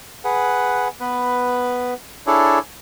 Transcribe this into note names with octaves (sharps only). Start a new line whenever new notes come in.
G#4 B4 F#5
B3 B4
D4 E4 G#4 A4 C#5 D5